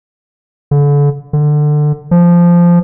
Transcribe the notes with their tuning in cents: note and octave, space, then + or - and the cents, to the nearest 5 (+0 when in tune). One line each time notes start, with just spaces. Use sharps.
D3 -35
D3 +20
F3 -10